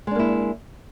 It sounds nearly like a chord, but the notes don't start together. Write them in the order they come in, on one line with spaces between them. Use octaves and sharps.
G#3 D4 A#3 E4